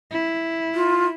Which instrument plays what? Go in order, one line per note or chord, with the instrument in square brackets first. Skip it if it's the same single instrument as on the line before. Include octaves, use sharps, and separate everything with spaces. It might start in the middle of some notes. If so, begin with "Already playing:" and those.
[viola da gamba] E4
[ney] F4